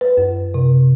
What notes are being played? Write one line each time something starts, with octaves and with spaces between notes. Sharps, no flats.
B4
F#2
C3